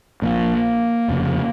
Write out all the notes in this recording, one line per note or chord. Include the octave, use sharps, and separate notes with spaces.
A#1 A#2 A#3
F1 F2 C#3